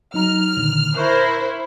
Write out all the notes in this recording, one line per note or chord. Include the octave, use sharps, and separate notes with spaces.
F#3 D#4 A#5 F6
A#2 D3 D#3
E4 A#4 C5 A#5 C#6 F#6